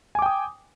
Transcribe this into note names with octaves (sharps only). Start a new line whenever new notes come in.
G5 G#5 D6 D#6